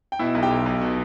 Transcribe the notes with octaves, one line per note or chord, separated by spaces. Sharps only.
G5
B2 E4 E5
B1
G4 G5
B1
B1
B2